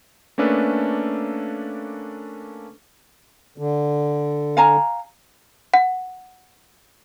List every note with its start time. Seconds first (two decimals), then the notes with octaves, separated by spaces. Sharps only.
0.38 A3 A#3 C#4 D4 A4 B4
3.58 D3
4.57 F5 G#5 A#5
5.74 F#5